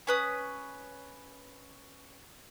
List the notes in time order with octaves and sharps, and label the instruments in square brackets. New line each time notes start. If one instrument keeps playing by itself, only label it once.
[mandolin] C#4 B4 D#6